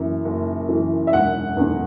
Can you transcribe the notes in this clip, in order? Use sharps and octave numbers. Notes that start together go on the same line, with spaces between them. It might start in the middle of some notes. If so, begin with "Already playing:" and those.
Already playing: F#1 F#2 E3
F#1
F#2 E3
E5
E1 F#5
E2 D3